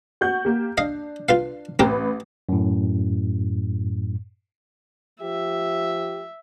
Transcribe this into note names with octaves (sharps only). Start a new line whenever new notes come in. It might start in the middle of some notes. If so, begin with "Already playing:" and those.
F#4 F#5 G6
A#3 G4
D4 D#5 F5
F4 B4 F5
A1 C4 G4 A#4 B4
F#2 A2
F3 G4 E5